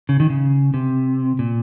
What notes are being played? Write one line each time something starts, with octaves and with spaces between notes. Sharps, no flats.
C#3
D#3
C#3
C3
A#2